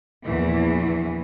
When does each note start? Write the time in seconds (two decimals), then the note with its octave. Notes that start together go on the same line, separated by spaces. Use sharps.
0.24 A#1 E2 E3